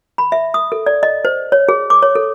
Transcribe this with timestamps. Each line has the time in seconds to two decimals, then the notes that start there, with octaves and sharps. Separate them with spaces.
0.18 B5
0.32 E5
0.54 D#6
0.72 A4
0.86 D5
1.03 D#5
1.25 C5
1.52 C#5
1.69 G#4
1.90 D6
2.03 C#5
2.15 A4